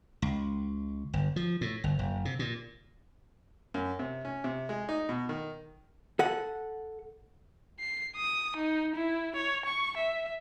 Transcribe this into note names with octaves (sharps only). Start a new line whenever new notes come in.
C#2
G1
F3
A2
G1
F#1
C3
A#2
F#2
C3
C#4
C3
G#3
D#4
B2
D#3
A4 F#5
C7
D#6
D#4
E4
C#5
C#6
E5